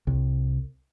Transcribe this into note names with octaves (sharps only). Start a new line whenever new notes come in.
C2